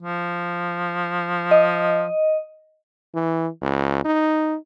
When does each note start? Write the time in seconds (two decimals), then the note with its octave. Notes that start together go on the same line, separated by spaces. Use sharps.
0.03 F3
1.51 D#5
3.14 E3
3.62 C#2
4.05 D#4